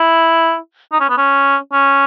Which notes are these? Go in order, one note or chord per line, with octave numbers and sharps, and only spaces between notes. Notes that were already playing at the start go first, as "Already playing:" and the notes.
Already playing: E4
D#4
C#4
B3
C#4
C#4